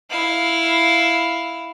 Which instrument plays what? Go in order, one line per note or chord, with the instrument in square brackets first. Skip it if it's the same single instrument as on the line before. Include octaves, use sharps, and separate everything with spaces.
[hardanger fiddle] E4 F5